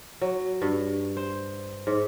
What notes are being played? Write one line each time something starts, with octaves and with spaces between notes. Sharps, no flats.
F#3
G2
C5
G#2